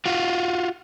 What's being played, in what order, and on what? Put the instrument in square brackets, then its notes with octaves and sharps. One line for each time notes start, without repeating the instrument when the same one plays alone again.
[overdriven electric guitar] F4 F#4